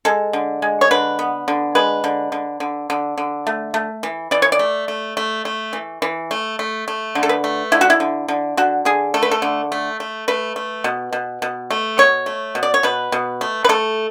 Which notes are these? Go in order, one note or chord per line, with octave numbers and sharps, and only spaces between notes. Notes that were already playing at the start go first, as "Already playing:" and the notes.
G#3 A4
D3
G#3
C#5
D3 B4
B3
D3
G#3 B4
D3
D3
D3
D3
D3
A3
A3
E3
E3 D5
C#5
D5
A3
A3
A3
A3
E3
E3
A3
A3
A3
D3
A4
B4
A3
D3 E4
F#4
E4
D3
D3
D3 F#4
D3 G#4
A3 A4
B4
A4
D3
A3
A3
A3 B4
A3
B2
B2
B2
A3
B2 C#5
A3
B2
D5
C#5
B2 B4
B2
A3
B4
A3 A4